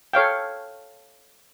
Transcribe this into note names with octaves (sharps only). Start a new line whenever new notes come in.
A4 C#5 F5 G5